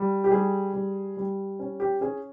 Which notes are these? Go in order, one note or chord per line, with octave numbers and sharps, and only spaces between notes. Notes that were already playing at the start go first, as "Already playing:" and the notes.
Already playing: G3
G4
G3 G#4
G3
G3
C#4
G4
C#4 G#4